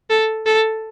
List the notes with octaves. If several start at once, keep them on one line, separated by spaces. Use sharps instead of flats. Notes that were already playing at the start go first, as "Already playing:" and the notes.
A4
A4